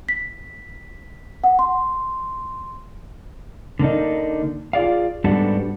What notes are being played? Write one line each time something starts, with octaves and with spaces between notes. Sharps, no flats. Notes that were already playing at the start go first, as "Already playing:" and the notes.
B6
F#5
C6
D3 A#3 D4 D#4
F4 G#4 D5 F5
G#2 G3 B3 D4 F#4 A4